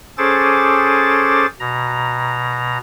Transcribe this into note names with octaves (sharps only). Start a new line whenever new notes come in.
C#4 G#4 A4 C5 D6 A6
B2 A#5